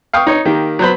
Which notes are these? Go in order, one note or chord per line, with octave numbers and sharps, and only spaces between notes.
F5 G5 C#6 D#6
D#4 C#5
D#3 A#3 G4
F#3 B3 C5 B5